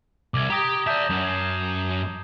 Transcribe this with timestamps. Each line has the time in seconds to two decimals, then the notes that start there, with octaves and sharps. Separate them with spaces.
0.34 C2 D6 G#6
0.50 G4 G5 A#5 D#6 A#6
0.87 D5 E5 A5 G6 E7
1.10 F#2
1.25 G#6 C7 E7